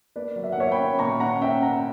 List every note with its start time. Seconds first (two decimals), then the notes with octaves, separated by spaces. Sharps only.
0.16 A#3 B4 D5
0.36 F#3
0.43 E5
0.52 F#5
0.57 A#3 C#5 E5
0.72 G5 B5
0.79 C#4
0.99 A#2 A#5 C#6
1.20 C#4 F#5 A#5
1.41 C#4 E5 G5
1.62 C#4 F#5 A#5